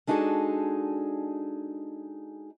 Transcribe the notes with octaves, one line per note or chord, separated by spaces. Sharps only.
G#3 D4 D#4 F#4 G#4 A4